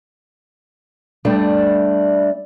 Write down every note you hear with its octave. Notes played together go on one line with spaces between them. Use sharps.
G3 A3 D4